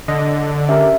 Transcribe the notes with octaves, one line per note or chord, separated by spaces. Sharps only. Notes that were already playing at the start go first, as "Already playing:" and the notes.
D3 D#5
C#4 G4 A#4 E5